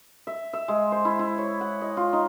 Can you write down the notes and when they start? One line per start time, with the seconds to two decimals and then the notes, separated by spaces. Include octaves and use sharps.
0.27 E5
0.53 E5
0.68 G#3
0.92 C5
1.05 E4
1.19 E4
1.38 C#5
1.61 F#5
1.81 D#5
1.97 F4
2.13 D#4